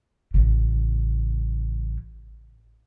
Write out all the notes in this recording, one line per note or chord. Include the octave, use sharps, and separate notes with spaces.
A1 C#3